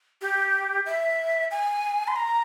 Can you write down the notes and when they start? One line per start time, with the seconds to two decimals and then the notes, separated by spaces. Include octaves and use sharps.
0.21 G4
0.86 E5
1.51 G#5
2.08 C6
2.16 A#5